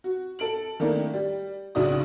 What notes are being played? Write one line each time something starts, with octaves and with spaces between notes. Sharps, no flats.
F#4
A4 D7 F#7
D#3 A3 A#3 D4 E4
G3
B1 C#3 D4 E4 F#4 D#6